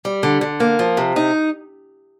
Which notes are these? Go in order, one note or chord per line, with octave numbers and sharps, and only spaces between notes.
G3
D3
D3
A#3
F3
C3
D#4